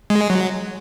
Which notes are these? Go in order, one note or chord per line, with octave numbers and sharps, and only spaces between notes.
G#3
F#3